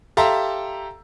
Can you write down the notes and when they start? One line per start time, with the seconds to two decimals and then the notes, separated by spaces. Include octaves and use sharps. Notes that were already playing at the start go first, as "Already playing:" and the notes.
0.17 G4 A4 E5 F5 A#5 C6